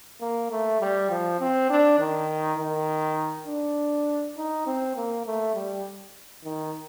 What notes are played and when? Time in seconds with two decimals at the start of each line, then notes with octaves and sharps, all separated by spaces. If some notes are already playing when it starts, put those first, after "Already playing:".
0.21 A#3
0.51 A3
0.81 G3
1.10 F3
1.40 C4
1.70 D4
1.99 D#3
2.58 D#3
3.47 D4
4.37 D#4
4.67 C4
4.96 A#3
5.26 A3
5.55 G3
6.44 D#3